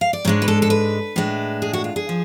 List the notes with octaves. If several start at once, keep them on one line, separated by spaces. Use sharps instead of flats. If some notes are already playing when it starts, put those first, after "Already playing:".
F5
D5
G#2 G#3 D4 C#5
B4
A4
A4
B4
A2 G#3 D4
G#4
F#4
F4
G#4
F3